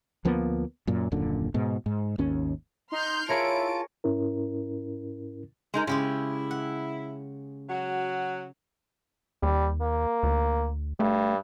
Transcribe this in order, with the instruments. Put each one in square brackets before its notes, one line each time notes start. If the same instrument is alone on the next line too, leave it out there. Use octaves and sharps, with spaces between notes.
[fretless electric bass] D2 F3 A#3 B3
F#2 A#2
D#1 F#2 A#2 D3
G#2 B2
G#2
G#1 D#2 C#4
[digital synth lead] D#4 [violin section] C6 F6 G6
[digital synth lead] E4 [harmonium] F4 A5 [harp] G#4 A#4 C#5 [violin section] D7
[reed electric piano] G#2 C#4 E4 A#4
[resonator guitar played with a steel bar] G#3 D#4 A#4
[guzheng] C#3 G4 G#4 [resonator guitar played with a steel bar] G#3 [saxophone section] E4
[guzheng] F#5
[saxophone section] F#3 F#4
[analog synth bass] D#2 [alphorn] G3
[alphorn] A#3
[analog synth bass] D2
[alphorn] G2 [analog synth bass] A3